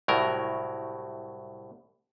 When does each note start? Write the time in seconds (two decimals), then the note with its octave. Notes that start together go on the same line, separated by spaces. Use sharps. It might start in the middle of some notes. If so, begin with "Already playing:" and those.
0.08 C2 A2 F#3 A#4